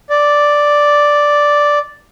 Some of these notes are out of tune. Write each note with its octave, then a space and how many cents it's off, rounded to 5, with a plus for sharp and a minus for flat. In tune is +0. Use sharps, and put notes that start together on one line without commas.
D5 +0